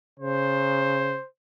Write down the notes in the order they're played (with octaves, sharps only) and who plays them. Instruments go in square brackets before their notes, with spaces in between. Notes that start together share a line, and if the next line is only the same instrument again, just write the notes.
[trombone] C#3 [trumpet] C5